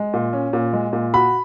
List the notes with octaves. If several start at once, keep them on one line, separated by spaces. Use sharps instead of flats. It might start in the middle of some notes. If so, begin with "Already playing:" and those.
Already playing: G#3
A#2
C#4
A#2
G#3
A#2
F#4 B5